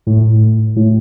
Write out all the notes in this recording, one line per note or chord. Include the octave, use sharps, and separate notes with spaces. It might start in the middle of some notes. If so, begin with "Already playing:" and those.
A2
A2